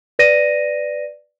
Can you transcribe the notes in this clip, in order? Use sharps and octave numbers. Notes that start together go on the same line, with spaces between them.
B4 D5 A#6 D#7